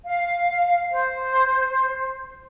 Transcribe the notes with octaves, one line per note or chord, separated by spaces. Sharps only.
F5
C5